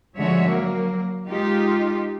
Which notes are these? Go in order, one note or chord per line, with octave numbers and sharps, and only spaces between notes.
D3 F3 G#3 F#4 C#5 E5
F#3 A#3
G#3 D#4 F4 G4